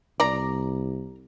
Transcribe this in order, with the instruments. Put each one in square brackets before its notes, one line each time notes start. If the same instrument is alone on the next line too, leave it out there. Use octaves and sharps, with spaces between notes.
[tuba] C2 [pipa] D5 A#5